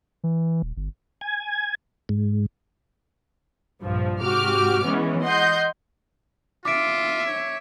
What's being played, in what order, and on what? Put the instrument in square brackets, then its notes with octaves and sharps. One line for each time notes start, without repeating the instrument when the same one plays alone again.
[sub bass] E3
D#1
G1
[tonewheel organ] G#5
G#2
[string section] A#1 G2 F3
G#2 C3 F#4 G4 D6 F6
E3 G#3 B3 C#4
D#5 F#5 C6 G6
[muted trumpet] F4 [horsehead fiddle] E5 [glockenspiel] D6 D7
[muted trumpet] C#5